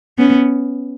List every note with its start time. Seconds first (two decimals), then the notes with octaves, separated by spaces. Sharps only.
0.18 B3 C#4